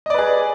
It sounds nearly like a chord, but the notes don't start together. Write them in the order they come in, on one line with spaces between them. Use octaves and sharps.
D#5 D5 B4 G#4